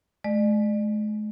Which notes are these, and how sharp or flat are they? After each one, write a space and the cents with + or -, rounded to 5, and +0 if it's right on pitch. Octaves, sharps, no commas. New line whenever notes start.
G#3 +45 D5 +40